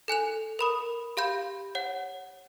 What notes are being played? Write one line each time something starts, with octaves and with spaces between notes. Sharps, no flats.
A4 G#5 F#6 F7
A#4 B5 D#6
G4 F5 B5 G6
C#5 F#5